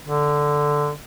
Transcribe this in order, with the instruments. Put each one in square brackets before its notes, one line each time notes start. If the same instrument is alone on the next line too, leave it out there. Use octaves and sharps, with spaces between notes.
[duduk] D3